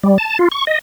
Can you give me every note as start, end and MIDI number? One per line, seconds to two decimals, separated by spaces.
0.03 0.18 55
0.18 0.38 81
0.39 0.48 65
0.52 0.65 85
0.67 0.79 75